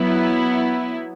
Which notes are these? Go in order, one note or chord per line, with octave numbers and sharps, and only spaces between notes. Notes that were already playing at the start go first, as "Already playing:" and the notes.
Already playing: F#3 B3 E4